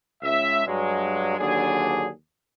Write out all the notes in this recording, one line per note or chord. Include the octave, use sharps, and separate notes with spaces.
C#2 E5
G2 F#3 G#3
D#2 D3 F#3 D4 G#4